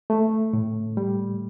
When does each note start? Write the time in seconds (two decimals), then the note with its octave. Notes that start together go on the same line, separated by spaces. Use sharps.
0.10 A3
0.53 A2
0.97 G3